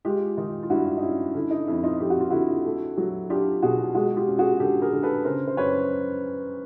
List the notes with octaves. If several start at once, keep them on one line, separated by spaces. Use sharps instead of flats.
G#3 F4 G4
D#3 D#4 F4
F4
G2 E4 F#4
D#4
C#4 E4
D3 E4
D#4
F2 E4
D#4 F4
F2 G4
F#4
F4
D3 E4 F#4
A3
F#3
D4 F4 G4
B2 F#4 G#4
G#3 F#4 G#4
F4 G4
C#4
F#4 G#4
D3 G4 A4
G#4 A#4
D3
A4 B4
C#3 A#4 C5
C5
F#2 B4 C#5